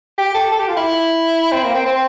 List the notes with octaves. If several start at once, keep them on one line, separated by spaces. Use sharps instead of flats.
G4
A4
A4
G4
F4
E4
C4
A#3
C4
C4